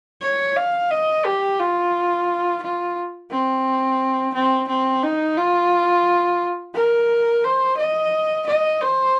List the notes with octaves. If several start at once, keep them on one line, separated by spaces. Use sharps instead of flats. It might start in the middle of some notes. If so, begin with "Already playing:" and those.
C#5
F5
D#5
G4
F4
F4
C4
C4
C4
D#4
F4
A#4
C5
D#5
D#5
C5